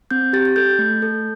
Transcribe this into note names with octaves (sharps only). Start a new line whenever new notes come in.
C4 G6
G4 A6
A6
A4 G6
A3
A4